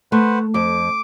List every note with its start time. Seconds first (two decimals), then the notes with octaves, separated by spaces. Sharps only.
0.12 A3 B4 C5 F#5
0.54 F2 D6